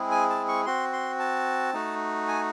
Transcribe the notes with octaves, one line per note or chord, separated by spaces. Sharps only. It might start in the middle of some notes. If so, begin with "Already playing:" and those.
Already playing: G#3 C4 E4 G#4
G#5
A5
C#6
C4 F#4 C6
C6
A5
A3 D#4 F#4
G#5